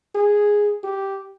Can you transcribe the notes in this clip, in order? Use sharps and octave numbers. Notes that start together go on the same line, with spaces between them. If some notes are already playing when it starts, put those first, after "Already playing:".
G#4
G4